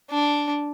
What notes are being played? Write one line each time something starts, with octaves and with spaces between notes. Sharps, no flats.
D4